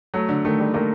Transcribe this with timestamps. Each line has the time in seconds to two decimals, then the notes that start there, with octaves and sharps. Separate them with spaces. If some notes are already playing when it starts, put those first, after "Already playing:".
0.14 F#3 A3
0.29 D3
0.45 D#3 A3
0.60 G3
0.74 A3 A#3